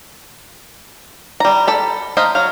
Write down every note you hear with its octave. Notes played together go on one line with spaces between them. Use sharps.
G3 A#5
A4 B5
C5 D#5 F5 A#5 B5
F#3 F5